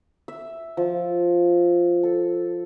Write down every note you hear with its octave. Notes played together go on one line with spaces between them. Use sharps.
E5
F3
A4